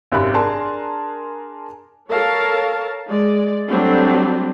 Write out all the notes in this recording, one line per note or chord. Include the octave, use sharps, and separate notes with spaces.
G#1 F#2 C3 B5 F#6
D4 G#4 A#4 A5 C6
A4 A#4 C#5 F5 A5
G#3 D5
F#3 G3 A3 C4 D4